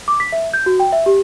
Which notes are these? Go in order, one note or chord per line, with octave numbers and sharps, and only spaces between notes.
D6
B6
E5
G6
F#4
G5
E5
G4